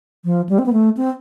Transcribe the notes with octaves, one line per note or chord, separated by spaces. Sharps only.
F3
G3
C4
B3
A3
C4